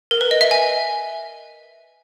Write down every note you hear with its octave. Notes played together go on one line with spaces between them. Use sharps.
A#4
B4
D#5
E5
G#5